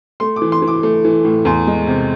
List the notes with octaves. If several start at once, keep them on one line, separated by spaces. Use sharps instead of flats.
A3 C6
D6
E3
C6
E3
D6
A3
E3
A2
E2 C6
G#3
C3